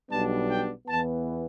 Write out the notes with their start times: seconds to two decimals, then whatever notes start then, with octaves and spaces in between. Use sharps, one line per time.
0.09 B1 B2 G3 B3 D4 A5
0.48 G5
0.87 E2 E3 B3 A5